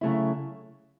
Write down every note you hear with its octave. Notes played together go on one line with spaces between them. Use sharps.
C#3 F#3 A3 E4